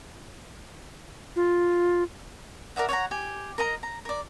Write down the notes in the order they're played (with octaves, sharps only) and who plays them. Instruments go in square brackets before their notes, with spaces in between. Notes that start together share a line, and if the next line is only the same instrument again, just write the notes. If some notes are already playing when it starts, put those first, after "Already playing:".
[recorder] F4
[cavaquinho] A#4 D5 E5 F#5
C#5 D5 F#5 A#5
G4 G#5
A#4 D#5 A#5
A#5
A#4 D5